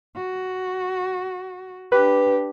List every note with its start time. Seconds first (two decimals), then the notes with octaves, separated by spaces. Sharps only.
0.16 F#4
1.92 D4 G4 B4